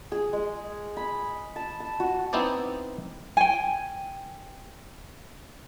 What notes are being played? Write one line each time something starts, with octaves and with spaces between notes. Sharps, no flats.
G#4
G#3
B5
A5
A5
F#4
B3 C4 D#4 E4 C5 D5
G5 G#5